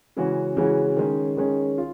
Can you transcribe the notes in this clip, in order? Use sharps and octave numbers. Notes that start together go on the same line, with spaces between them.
C#3 E3 G#3 C#4 F#4
C#3 E3 G#3 C#4 F#4
D#3 G#3 C#4
D#3 G#3 C#4
F4